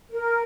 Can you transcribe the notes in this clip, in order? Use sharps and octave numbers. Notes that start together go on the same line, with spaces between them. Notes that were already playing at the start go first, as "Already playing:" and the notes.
A#4